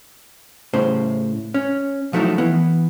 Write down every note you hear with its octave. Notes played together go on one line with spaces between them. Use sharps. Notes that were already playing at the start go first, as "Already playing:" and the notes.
A2 C#3 C5
C#4
F3 F#3 A3 D#4 E4
E3 B3